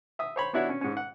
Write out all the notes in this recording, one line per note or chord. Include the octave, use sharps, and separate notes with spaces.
E5 D#6
C5 C#5 B5
B3 D4 E4 F#4 C#5 F#5
C#4
G#2 C#4
F#5